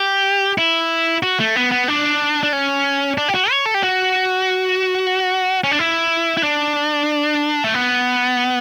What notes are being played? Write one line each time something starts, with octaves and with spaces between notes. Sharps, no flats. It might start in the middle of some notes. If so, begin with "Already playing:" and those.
Already playing: G4
E4
F#4
A3
B3
B3
D4
D4
C#4
D4
G4
F#4
C#5
A4
G4
F#4
C#4
D4
E4
E4
D4
A3
B3